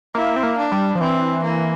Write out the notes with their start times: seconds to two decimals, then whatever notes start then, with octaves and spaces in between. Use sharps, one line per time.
0.15 A#3 E4
0.36 C4
0.43 A#3
0.57 D4
0.72 G3
0.95 F3
1.00 E3 C4
1.43 A#3